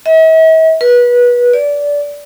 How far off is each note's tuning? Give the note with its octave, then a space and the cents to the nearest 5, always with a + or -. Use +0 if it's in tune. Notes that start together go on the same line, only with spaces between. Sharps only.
E5 -45
B4 -25
D5 -20